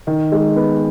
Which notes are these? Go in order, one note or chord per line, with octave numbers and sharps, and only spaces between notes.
D#3
G#3
B3